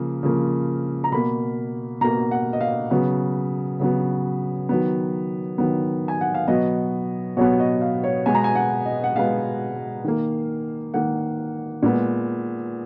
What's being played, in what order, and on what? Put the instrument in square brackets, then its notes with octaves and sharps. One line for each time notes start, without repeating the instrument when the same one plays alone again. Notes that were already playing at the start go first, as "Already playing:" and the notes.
Already playing: [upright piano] C#3 F3 A#3
C#3 F3 A#3
A#5
B2 A#3 B5
B2 A#3 A#5
F#5
D#5
F5
C#3 F#3 B3
C#3 F#3 B3
D#3 F#3 B3
D#3 F#3 B3
G#5
F#5
F5
B2 F#3 B3 D#5
B2 F#3 B3 C#5
D#5
F5
C#5
B2 G#3 B3 G#5
A#5
G#5
F#5
D#5
F#5
B2 G#3 B3 F5
D#3 A#3
D#3 A#3 F#5
A#2 G#3 B3